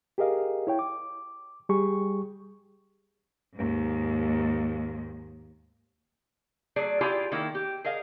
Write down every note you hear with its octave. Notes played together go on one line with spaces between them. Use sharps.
G4 G#4 A#4 D#5 F5
E4 C#5 G5
D6
G3 G4 G#4 C#6
D#2 G#2
F#3 A3 G#4 D5
E4 F4 G4 G#4 D5 G#5
D#3 A#3 E4
G4
G#4 A#4 D#5 F5